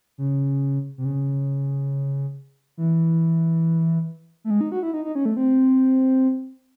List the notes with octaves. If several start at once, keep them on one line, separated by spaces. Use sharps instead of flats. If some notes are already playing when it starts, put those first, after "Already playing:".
C#3
C3
C#3
E3
A3
G#3
D#4
F#4
E4
D#4
D#4
C#4
A3
C4